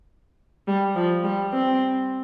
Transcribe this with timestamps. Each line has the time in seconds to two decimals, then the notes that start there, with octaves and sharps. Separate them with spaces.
0.68 G3
0.96 F3
1.24 G3
1.53 C4